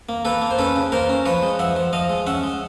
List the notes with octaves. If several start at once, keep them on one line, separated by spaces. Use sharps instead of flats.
A#3
A#3 A4 B4
A#3
C5
C#4 A4 B4
C#3
A#3 A#4 C5
C#4
F3 B4 C#5
G#3
F3 E5 F#5
F3
F3 D#5 F5
G#3
C#4 E5 F#5
G#3